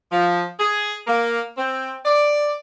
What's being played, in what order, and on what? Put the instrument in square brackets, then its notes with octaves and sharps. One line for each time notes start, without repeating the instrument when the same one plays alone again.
[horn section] F3
G#4
A#3
C4
D5